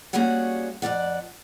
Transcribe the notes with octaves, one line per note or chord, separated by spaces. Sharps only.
G3 A#3 C#4 F#4 G#4 F#5
F2 F#3 D5 F#5